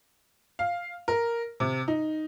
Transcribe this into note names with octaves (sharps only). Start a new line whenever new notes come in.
F5
A#4
C3
D#4